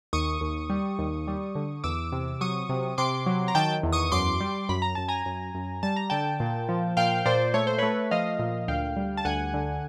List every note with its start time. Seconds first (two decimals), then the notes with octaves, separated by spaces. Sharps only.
0.13 D#2 C#6 D#6
0.41 D#2
0.70 G3
0.99 D#2
1.28 G3
1.55 D3
1.84 E2 D6 E6
2.12 C3
2.41 F#3 C#6 D#6
2.69 C3
2.98 C3 C6 D6
3.26 F#3
3.48 A#5
3.55 D#3 G5 A5
3.83 E2
3.93 C#6 D#6
4.12 F#2 C6 D6
4.40 G3
4.69 F#2 B5
4.82 A#5
4.95 F#2 A5
5.08 G#5 A#5
5.26 F#2
5.55 F#2
5.83 G3 A5
5.96 A#5
6.10 D3 G5 A5
6.40 A#2
6.69 F3
6.97 A#2 F5 G5
7.26 A#2 C5 D5
7.54 A3 C#5
7.67 C5
7.78 A3 B4 C#5
8.11 F3 D#5 F5
8.39 A#2
8.68 D2 F5 G5
8.97 G3
9.17 A5
9.25 D2 F#5 G#5
9.54 D3